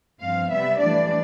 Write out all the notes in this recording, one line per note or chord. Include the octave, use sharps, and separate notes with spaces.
G2 F3 C4 F5
C3 G3 B3 E5
A2 E3 G3 D4 D5